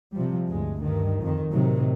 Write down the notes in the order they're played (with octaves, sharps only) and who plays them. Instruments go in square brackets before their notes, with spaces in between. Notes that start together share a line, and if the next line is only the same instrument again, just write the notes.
[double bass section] C3 F3 G3
D2 G2 G#3
G2 D#3
F2 D#3
A2 C3 D#3 F#3